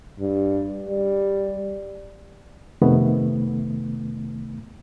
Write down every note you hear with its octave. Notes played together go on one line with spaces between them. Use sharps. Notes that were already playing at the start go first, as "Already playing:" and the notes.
G2
G3
F2 C3 D#3 A3 B3